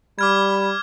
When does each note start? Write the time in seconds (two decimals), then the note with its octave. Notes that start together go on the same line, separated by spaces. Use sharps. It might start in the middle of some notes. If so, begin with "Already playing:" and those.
0.19 G3 B5 D6 F6 G#6